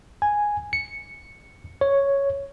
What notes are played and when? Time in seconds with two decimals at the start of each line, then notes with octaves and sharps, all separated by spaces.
0.22 G#5
0.73 C#7
1.81 C#5